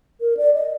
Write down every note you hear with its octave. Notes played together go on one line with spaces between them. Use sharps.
A#4
D5
D#5